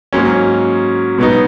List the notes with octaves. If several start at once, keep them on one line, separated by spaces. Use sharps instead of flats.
G#2 F#3 A#3 C#4
B2 F#3 B3 D#4